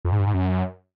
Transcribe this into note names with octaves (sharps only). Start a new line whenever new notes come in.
F2
G#2
G2
G#2
F#2